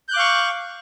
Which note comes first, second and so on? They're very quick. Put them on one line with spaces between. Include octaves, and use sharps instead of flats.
G6 F#6 D6 F5 C#6